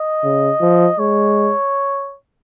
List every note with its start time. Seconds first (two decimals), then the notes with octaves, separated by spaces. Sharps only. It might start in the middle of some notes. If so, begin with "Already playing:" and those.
Already playing: D#5
0.23 C#3
0.61 F3
0.99 G#3 C#5